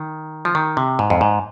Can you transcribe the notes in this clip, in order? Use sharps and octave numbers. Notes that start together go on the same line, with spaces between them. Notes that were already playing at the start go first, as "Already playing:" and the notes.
Already playing: D#3
F3
D#3
C3
G#2
F2
G#2